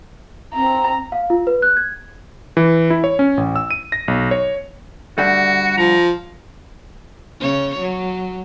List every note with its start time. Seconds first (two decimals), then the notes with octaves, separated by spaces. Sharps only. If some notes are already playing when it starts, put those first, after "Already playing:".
0.54 C4 A#5
1.12 F5
1.30 F4
1.47 B4
1.62 F#6
1.77 G#6
2.57 E3
2.90 E4
3.04 C#5
3.19 C#4
3.37 A1
3.56 E6
3.71 D#7
3.92 A#6
4.08 B1
4.31 C#5
5.18 D3 G3 A3 F#4
5.78 F3 A#5
7.41 C#3 C#5
7.80 F#3